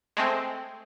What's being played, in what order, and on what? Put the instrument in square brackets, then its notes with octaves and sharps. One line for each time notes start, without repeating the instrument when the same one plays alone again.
[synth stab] G#3 A3 C4